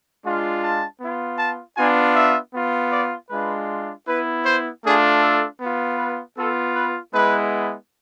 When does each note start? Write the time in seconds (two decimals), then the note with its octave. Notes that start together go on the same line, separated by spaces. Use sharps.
0.24 G#3 D4 F4
0.63 A5
1.00 B3 F4
1.39 A5
1.77 B3 D4 F4 G#5
2.16 E5
2.53 B3 F4
2.92 D5
3.30 G#3 D4 F4 B4
4.07 B3 E4 B4
4.45 C5
4.83 A3 D4 F4 G#4
5.22 A4
5.60 B3 F4
5.98 B4
6.36 B3 F4 A4
6.75 B4
7.13 G#3 B3 E4 B4